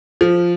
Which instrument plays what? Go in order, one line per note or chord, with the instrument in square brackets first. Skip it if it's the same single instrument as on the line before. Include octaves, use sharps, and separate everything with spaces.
[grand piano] F3